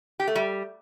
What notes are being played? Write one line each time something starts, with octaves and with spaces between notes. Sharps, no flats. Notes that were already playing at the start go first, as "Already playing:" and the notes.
G4
A3
G3